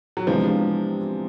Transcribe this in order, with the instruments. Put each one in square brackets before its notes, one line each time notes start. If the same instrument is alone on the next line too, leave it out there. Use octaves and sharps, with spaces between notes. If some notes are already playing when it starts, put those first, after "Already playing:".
[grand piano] F#3
[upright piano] C3 E3 G#3 B3 D4 [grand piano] F3